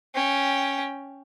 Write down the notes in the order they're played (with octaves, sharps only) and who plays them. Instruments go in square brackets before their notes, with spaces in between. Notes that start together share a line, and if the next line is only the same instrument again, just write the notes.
[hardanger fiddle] C#4 G5